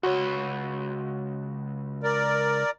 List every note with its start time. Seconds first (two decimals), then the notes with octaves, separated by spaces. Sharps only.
0.03 C#2 F#4 C#5
2.03 A#4 D5